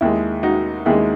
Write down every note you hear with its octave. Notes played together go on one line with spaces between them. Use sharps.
D#2 D#3 G#3 E4
D#4 F#4
D#2 D#3 G#3 E4 G#4